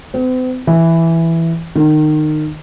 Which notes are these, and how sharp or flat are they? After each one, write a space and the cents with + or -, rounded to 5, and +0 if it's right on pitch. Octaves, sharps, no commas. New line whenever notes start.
C4 -45
E3 +5
D#3 -25